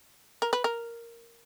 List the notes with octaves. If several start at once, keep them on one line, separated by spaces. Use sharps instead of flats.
A#4
B4
A#4